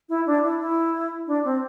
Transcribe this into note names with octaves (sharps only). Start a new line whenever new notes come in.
E4
D4
E4
E4
D4
C4